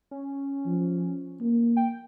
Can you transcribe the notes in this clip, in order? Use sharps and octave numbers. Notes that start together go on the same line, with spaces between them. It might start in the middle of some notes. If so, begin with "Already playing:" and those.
C#4
F3
A#3
G5